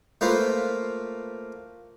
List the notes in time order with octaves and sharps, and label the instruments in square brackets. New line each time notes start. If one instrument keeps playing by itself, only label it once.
[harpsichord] A3 A#3 F4 B4 C5